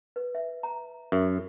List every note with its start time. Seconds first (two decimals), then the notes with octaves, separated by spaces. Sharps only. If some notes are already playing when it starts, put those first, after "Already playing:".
0.16 B4
0.35 E5
0.63 A#5
1.12 F#2 E5